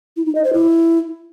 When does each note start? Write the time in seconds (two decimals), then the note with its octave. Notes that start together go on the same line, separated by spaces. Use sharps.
0.17 E4
0.26 D#4
0.35 D#5
0.44 C5
0.53 E4